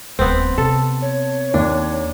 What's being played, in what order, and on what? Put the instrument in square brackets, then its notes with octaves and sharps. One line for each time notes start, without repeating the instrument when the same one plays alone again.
[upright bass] D1 [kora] B3 C4
[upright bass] C3 [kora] A4 [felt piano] A5
[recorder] C#5
[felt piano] D#2 [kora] D4